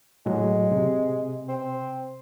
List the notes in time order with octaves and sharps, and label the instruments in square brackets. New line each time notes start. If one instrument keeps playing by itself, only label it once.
[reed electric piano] A2 F#3 [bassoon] G#3
[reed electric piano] C3
[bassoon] C4